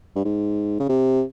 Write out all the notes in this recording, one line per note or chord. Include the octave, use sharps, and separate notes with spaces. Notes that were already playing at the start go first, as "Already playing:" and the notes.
G2
G#2
C#3
C3